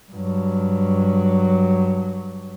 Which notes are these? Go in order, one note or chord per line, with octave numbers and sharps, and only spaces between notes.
G2 F#3